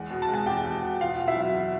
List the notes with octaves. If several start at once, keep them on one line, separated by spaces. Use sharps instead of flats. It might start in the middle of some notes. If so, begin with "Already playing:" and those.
Already playing: E2 G#3
B2
A5
G#3 G#5
E2 G4 G5
E2
B2
E2 F4 F5
B2
E4 E5
F#3
E2